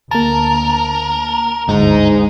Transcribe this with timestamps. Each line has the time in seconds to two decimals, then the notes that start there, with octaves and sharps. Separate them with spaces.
0.11 D2 A#3 A#4 A5
1.69 G1 D2 G#2 D#4